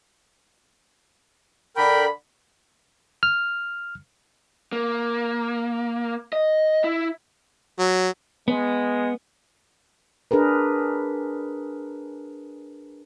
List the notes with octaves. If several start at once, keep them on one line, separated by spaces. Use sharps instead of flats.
D3 A#4 G5 B5
F6
A#3
D#5
E4
F#3
G#3 B3
D4 G#4 A#4 B4